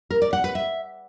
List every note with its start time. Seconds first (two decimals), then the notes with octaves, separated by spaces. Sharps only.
0.10 A#4
0.22 D5
0.33 F#5
0.44 B4
0.55 E5